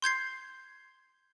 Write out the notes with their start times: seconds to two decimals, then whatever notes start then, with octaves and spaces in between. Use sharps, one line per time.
0.02 C6 G6 G#6 C7